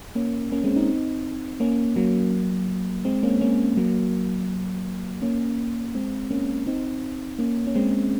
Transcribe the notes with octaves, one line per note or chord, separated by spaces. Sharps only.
A#3 C#4
A#3 C#4
G#3 C4
C4 D#4
A#3 C#4
F#3 A#3
G#3 C4
A#3 C#4
A#3 C#4
F#3 A#3
A#3 C#4
G#3 C4
A#3 C#4
C4 D#4
A#3 C#4
C#4
G#3 C4